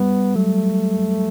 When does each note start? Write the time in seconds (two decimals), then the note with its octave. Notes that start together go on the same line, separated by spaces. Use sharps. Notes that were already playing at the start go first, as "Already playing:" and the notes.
Already playing: G3 B3
0.35 F#3 A3